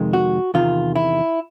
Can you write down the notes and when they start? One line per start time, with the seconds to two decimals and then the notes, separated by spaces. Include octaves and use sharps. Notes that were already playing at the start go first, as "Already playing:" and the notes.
Already playing: F2 C3 D#3 G#3
0.13 F#4
0.54 E2 C3 D#3 F4
0.96 E4